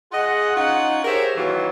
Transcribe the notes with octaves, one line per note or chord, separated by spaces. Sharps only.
F4 G#4 D#5 F#5
C#4 D#4 F4 F#5
G4 G#4 A#4 C5 C#5 E5
B2 D#3 E3 F#3 A#3 F4